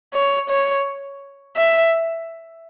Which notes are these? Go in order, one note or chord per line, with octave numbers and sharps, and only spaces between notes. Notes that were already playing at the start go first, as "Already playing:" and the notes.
C#5
C#5
E5